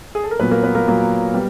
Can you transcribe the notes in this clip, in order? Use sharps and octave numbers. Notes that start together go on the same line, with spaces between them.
G#4
A4
A#4
A#2 F#3 A#3 B3 B4
A#3 A#4
B3 B4
A#3 A#4
A#2 F#3 A#3
G3 B3